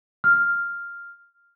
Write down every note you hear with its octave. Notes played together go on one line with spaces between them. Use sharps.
F6